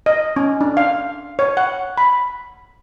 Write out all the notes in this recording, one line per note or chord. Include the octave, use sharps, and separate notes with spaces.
D#5
C#4
D4
F5
C#5
F#5
B5